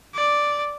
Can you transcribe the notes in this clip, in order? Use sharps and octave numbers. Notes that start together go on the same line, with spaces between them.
D5